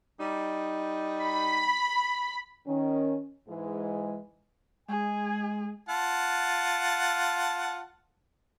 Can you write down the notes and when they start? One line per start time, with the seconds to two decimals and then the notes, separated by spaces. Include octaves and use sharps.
0.20 G3 D#4
1.23 B5
2.67 D#3 C#4
3.48 G#2 E3 G#3
4.88 G#3 G#4 G#5
5.89 F4 F#5 A5